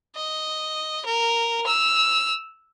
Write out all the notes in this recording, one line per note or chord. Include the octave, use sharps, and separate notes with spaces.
D#5
A#4
E6 F6